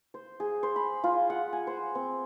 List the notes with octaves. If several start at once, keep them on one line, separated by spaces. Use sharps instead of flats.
C5
G#4
C5
B5
F4
F#5
G#5
C5
C4